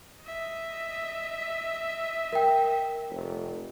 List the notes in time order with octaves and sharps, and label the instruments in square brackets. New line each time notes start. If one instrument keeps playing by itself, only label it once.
[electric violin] D#5 E5
[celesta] A#4 G5
[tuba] F1